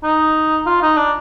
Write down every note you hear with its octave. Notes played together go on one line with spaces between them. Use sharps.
D#4
F4
D#4
D4